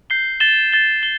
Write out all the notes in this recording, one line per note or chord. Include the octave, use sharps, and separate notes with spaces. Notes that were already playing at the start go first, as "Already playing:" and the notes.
G6 C7 G7
A6 E7 G7
A6 E7 G7
G7